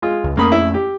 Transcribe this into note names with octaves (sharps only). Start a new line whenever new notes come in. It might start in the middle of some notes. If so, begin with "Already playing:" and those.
G#3 F4
C#2
F2 A3 A#3 C#4 B5 D#6
E4
G4